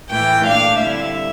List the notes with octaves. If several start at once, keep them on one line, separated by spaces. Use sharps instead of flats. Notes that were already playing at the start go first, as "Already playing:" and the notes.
A2 E3 A3 G5
A#2 A3 D4 F5
D3 G3 C4 E4 E5